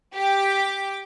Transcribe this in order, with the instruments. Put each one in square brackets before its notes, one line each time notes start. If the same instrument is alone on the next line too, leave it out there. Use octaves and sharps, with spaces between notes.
[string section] G4 D6